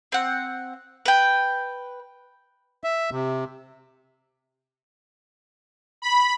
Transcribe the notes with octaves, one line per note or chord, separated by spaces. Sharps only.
C4 F#5
B4 G5
E5
C3
B5